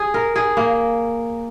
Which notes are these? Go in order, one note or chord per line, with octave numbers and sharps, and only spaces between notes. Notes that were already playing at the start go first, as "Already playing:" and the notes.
Already playing: G#4
A#4
G#4
A#3